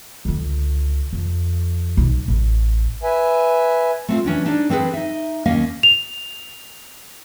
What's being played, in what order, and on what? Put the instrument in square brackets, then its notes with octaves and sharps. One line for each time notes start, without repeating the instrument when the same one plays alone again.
[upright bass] C#2 D3
F2
B1
A1
[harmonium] B4 E5 G#5
[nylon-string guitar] A3 C4 F4
E3 C#4 D4 C#5
D4 D#4 A4 C#5 D5
E3 C4 G#4 A4 B4
D#4 E5
D#2 A#3 C#4 D#5 F5
[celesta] F7